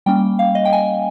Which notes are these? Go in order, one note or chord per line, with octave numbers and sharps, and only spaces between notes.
G3 A#3 C#4 G5
F5
D#5
G5
G#5